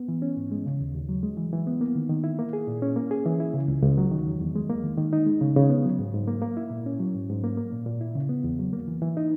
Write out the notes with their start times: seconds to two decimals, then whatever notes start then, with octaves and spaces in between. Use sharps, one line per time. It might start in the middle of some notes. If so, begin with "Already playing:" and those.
Already playing: B3
0.08 E3
0.22 C#4
0.37 G#2
0.51 G#3
0.66 C#3
0.81 D#2
0.95 D#2
1.09 F#3
1.23 G#3
1.37 E3
1.53 E3
1.67 B3
1.81 A#3
1.95 D#3
2.10 D#3
2.24 E4
2.39 A#3
2.53 G#4
2.68 A#2
2.82 C#4
2.96 A#3
3.11 G#4
3.25 E3
3.40 E4
3.54 C#3
3.68 C#2
3.82 C#2
3.98 F#3
4.11 D#3
4.27 E2
4.41 E2
4.55 G#3
4.70 A#3
4.84 D#3
4.98 D#3
5.13 D#4
5.26 G#3
5.41 C#3
5.56 C#3
5.70 B3
5.84 F#3
5.99 G#2
6.14 G#2
6.28 A#3
6.42 A#3
6.57 E4
6.71 A#2
6.86 C#4
7.00 F#3
7.14 G#2
7.29 G#2
7.44 A#3
7.57 A#3
7.72 A#2
7.86 A#2
8.01 E4
8.15 C#3
8.29 B3
8.44 E2
8.59 F#3
8.73 A#3
8.88 E3
9.02 E3
9.17 D#4